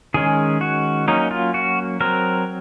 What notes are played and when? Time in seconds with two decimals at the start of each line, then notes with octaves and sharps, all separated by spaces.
0.14 D#3 G#3 C#4 G#4
0.61 F#4
1.08 F#3 A#3 C#4 D#4
1.31 F4
1.54 F#4
2.00 F#3 C4 A#4